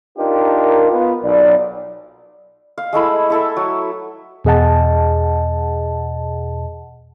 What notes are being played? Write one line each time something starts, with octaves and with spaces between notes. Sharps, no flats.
D4 D#4 F4 G4 A#4
B3 F4
B1 D5
F5
G#3 A3 E4 B5
E4 A4 E5
F#3
E2 B2 G#4 D#5 F#5 A5